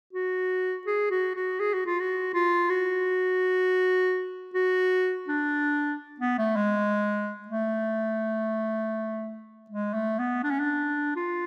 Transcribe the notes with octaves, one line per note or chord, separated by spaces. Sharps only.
F#4
G#4
F#4
F#4
G#4
F#4
F4
F#4
F4
F#4
F#4
D4
B3
A3
G#3
A3
G#3
A3
B3
D4
C#4
D4
F4